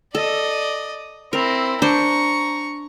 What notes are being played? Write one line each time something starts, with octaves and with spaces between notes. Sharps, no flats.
A4 D5 D#5
C4 E4 A#4
D4 C5 A#5 C#6